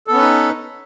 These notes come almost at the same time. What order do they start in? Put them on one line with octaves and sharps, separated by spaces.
A4 B3 C#4 B4 D#4